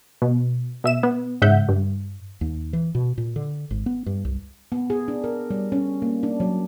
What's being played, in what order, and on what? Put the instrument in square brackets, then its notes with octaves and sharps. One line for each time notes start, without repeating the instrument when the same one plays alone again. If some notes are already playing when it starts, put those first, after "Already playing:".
[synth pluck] B2
B2 E5 E7
B3
G#2 C#3 E5 F#5 G6
G2
[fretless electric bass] D#2
E3
B2
A#2
D3
G#1
B3
G2
C2
[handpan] B3
G#4
D4
A#4
G3
C#4
A#3
D4
F#3